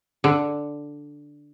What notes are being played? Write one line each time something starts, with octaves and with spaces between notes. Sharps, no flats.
D3